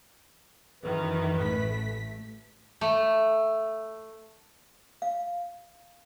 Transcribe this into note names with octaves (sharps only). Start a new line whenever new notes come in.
F#2 D#3 E3 B4
A1 A3 B6
A3
F5